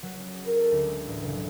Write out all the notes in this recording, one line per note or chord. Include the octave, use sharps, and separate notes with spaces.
F#3
C#4
G#4
A#4
A4
D2
G#3
A1
F#1
F#3